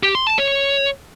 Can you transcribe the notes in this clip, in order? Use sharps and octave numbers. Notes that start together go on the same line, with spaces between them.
G4
C6
A5
C#5